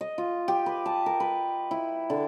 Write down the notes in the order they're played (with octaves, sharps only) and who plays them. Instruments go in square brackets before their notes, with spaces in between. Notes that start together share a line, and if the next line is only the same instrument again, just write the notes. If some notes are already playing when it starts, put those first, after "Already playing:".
[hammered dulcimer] D#5
F4
G4
B4
A5
A#4
B4
E4
D3